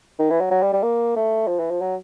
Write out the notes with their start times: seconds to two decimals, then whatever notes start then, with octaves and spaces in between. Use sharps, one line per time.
0.19 D#3
0.30 E3
0.41 F#3
0.51 F#3
0.62 G3
0.73 G3
0.83 A#3
1.16 A3
1.48 F3
1.59 E3
1.70 F3
1.81 F#3